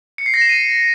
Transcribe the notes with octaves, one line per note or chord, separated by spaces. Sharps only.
C#7
C7
A#6
E7
D#7